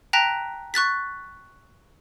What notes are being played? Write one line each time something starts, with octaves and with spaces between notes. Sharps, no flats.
G5 A5 A#5 F#6 A#6 B6
C#6 F#6 A6 B6